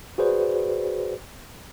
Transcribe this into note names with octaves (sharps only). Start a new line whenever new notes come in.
F#4 G#4 B4 C5 D5